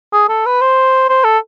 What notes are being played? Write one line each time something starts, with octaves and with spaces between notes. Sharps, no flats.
G#4
A4
B4
C5
C5
A4